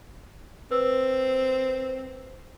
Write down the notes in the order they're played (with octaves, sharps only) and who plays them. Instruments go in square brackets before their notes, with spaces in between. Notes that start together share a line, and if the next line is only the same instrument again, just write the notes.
[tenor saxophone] C4 [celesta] B4 C5 E6